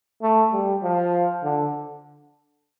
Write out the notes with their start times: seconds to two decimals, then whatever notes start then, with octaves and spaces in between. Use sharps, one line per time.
0.22 A3
0.52 G3
0.83 F3
1.44 D3